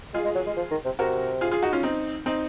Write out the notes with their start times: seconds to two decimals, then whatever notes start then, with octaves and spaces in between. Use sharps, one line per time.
0.14 G#3 F4 G#4
0.24 G#3
0.35 F#3
0.46 G#3
0.57 F3
0.71 D#3
0.85 C3
0.99 C3 F#4 A#4
1.41 F4 G#4
1.51 F4 G#4
1.62 D#4 F#4
1.73 C#4 F4
1.83 C4 D#4
2.26 C4 D#4